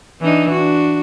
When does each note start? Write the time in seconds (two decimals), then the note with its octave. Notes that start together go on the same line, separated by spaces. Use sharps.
0.21 E3 D4 D#4
0.51 D4 F#4